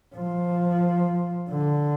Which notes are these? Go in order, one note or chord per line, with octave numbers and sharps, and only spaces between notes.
F3
D3